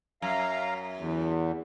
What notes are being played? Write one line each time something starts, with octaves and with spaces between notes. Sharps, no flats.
F#2 F5 A#5
E2